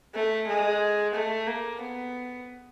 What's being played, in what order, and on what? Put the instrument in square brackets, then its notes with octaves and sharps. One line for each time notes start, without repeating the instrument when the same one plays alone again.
[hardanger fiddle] A3
G#3
A3
A#3
B3